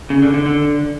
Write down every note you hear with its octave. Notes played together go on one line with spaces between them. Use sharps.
C#3
D3
D3
D3